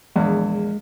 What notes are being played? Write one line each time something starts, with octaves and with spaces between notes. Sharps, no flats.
A#1 E2 G#3